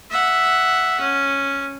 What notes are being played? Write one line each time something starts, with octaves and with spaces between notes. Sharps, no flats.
E5 F#5
C#4